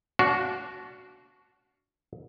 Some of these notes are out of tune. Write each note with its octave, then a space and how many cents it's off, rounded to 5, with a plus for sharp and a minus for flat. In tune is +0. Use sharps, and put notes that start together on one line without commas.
D4 -25 F#4 +0 F5 +0